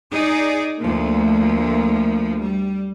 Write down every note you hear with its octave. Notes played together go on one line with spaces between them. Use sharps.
D#4 G#4 D5
D2 F3 A#3
G3